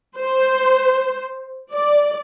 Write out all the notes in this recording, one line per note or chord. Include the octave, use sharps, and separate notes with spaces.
C5
D5